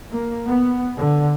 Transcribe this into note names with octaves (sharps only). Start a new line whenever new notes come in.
A#3
B3
D3